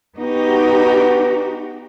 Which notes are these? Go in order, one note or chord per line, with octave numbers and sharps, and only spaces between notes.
B3 D#4 F#4 G4